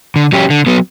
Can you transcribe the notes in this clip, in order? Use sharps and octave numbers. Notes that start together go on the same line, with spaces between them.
D3
F#3 C#4 G4
D3
F#3 B3